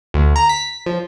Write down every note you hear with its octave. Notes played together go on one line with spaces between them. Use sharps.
D2
A#5
B6
F3